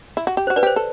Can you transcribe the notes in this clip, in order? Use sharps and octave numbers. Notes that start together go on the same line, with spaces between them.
E4
F#4
G4
F#4 C5
B4 D5
G4 C5
A4